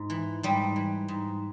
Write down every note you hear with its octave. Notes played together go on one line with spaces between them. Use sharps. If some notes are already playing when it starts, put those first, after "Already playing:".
Already playing: G#2
E3
G#2 G3
E3
G#2